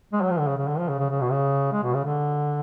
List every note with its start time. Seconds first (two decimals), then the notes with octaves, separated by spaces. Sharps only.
0.13 G#3
0.22 F#3
0.30 F3
0.39 D3
0.47 C#3
0.58 C#3
0.68 D3
0.78 F3
0.89 C#3
0.99 C#3
1.10 C#3
1.21 B2
1.31 C#3
1.72 G#3
1.83 B2
1.94 C#3
2.04 D3